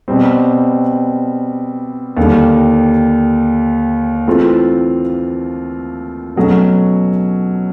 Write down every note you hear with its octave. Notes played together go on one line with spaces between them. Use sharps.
B2 G3 C4
D#2 D3 G3
E3 A3 C4 F4
B2 F#3 A3 C#4